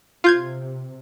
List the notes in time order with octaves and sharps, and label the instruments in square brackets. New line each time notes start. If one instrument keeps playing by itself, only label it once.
[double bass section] C3 [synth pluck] F4 G6 G#6